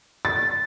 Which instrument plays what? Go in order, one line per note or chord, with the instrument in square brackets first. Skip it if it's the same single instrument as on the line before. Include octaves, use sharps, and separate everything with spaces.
[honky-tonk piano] A6